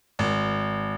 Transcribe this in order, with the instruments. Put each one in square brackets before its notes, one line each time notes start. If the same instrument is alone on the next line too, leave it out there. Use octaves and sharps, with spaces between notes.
[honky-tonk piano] G#1